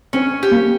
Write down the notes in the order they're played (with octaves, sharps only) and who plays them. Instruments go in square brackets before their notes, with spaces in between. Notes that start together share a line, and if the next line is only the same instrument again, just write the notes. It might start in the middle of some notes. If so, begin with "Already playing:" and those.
[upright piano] C4 [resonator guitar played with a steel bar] C#4
[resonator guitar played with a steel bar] G4
[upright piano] A#3